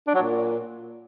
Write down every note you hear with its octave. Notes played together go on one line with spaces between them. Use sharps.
D4
F#3
A#2